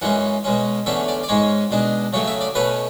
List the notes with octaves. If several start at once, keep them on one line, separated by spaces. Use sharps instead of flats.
F#2 E3 G#3 C#4 F#5
B2 G#3 C#4
E2 D3 A3 C#4 E5
D5
D5
G#2 G#3 C#4 C#5
B2 G#3 D4
C#3 F#3 A3 C#5
E5
D5
B2 A3 C#4 B4